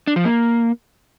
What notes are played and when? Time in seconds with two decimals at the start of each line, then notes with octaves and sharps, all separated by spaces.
0.07 D4
0.16 F3
0.25 A#3